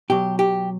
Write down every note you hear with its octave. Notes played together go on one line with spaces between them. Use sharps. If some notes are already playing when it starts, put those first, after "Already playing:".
B2 F#3 G4
G4